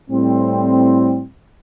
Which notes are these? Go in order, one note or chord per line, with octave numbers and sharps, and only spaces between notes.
A2 G3 C4